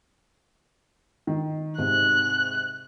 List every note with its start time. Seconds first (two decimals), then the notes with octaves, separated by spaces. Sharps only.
1.27 D#3
1.78 G#2 C3 F#6